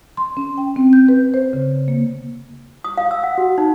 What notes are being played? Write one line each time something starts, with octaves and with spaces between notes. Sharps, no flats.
C6
C#4
G5
C4
G6
B4
C5
C#3
A#3
D#6
F5
E6
F#5
F#4
D#4